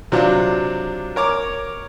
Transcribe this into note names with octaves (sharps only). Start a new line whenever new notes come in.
C3 F#3 D4 F4
A#4 C#5 D6